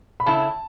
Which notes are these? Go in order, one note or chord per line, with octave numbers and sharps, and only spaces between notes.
B5
C#3 A3 E4 A5